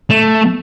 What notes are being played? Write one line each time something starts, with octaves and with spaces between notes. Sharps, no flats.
A3